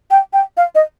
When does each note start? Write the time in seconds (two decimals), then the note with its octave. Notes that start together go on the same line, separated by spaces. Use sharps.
0.11 G5
0.33 G5
0.57 F5
0.75 D#5